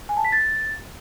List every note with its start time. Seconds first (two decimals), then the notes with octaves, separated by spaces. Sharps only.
0.09 G#5
0.17 A5
0.25 B6
0.32 A6